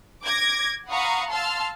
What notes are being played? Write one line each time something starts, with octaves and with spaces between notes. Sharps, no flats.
D6 G#6 A#6
F5 F#5 A#5 B5 C#6 D#6
F5 A5 C6 E6 F6